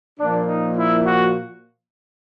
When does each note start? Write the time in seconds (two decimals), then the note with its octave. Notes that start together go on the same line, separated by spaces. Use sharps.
0.18 A#2 F3 A#3 D4
0.47 D#4
0.75 E4
1.04 F#4